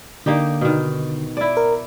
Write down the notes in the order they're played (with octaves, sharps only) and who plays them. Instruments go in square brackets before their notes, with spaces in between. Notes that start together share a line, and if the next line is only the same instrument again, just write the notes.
[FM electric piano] D3 [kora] A#3 D#4 G4
[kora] B2 D#3
E4 D5
[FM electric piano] A#4